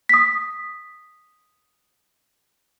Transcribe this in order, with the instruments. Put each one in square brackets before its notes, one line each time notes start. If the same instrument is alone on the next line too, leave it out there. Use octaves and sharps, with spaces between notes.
[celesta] D#6 B6